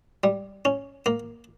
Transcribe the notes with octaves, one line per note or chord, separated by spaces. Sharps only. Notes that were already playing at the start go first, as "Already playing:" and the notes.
G3
C#4
A#3